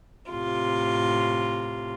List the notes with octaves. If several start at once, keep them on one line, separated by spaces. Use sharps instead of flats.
A2 C3 F4